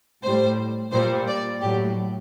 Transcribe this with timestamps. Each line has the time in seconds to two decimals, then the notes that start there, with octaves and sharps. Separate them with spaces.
0.23 A2 G3 C5
0.92 A#2 G3 C5
1.28 D5
1.61 A2 F#3 G4